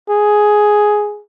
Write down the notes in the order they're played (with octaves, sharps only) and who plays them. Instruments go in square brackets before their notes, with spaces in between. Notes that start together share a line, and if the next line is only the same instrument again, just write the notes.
[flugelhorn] G#4